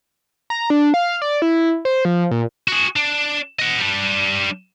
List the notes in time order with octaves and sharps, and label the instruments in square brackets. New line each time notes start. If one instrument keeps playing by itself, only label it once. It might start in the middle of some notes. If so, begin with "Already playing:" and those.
[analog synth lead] A#5
D4
F5
D5
E4
C5
F3
A#2
[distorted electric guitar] F#4 G#4
D4
D#5 F#5
G3 D4